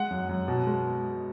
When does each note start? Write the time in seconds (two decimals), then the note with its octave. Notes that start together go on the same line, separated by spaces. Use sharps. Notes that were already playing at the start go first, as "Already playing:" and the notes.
Already playing: G#3 F#5
0.10 F#2
0.29 F#2
0.48 B2
0.67 G#3